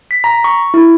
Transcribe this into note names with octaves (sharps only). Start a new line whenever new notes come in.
B6
A#5
C#6
E4